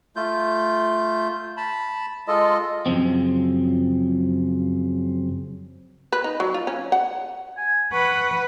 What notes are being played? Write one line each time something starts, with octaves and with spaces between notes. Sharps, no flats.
A3 F4 G6
A5 B5
G#3 F4 A4 D#5
F#2 C#3 F3 C4
B4
D#4
F#3
F4
C#4
F#5
G#5
B4 F#5 C#6